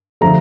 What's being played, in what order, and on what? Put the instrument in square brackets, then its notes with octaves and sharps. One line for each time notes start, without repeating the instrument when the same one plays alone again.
[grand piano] D3 F3 A3 A#5